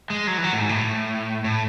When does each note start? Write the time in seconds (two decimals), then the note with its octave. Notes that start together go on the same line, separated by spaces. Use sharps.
0.10 G#3
0.27 F#3
0.38 E3
0.44 F#3
0.52 A2
0.60 G#2
0.69 A2
1.44 A2